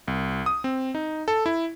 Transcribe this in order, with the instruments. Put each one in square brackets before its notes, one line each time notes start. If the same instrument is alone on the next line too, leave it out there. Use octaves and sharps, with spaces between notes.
[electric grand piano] C2
D#6
C4
D#4
A4
E4